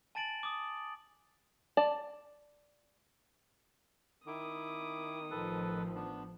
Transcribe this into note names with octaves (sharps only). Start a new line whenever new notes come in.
G#5 A5 A6 D7 F#7
D6 D#6
D5 A5
D#3 E4 D6 D#6
A1 F3 A4 B4
B3 D4